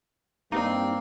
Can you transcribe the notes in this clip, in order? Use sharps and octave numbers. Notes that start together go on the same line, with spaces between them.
G2 G3 A#3 C4 D#4